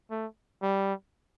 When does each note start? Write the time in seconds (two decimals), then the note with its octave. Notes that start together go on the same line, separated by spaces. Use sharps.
0.11 A3
0.62 G3